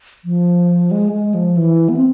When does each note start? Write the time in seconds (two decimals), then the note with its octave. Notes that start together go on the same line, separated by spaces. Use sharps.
0.25 F3
0.91 G#3
1.13 G#3
1.34 F3
1.57 E3
1.89 B3
1.97 C4